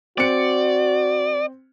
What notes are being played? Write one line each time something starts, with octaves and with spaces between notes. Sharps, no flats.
C4 F#4 D5 C#7